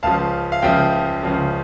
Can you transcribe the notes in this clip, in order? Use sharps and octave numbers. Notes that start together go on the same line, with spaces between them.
C#2 C#3 F3 F5 A5
F5
C#2 C#3 F3 E5 G5
C#2 C#3 F3